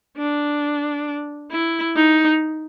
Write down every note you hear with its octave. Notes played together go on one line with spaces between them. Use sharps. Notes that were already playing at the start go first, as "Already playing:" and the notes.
D4
E4
D#4